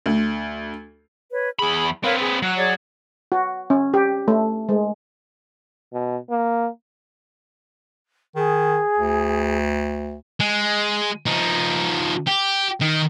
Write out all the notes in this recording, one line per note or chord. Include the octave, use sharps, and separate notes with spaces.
D2
B4 C#5
E2 G#4 B5
C4 A#4 B4 C#5 F5
G#4
F#3 F#6
G#4 C#5 D5
F#4
C#4
G4
A3
G#3
B2
A#3
D#3 G#4
D2
G#3
F3 D#4
G4
D#3